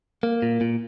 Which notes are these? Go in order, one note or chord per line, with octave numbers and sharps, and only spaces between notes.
A#3
A#2
A#2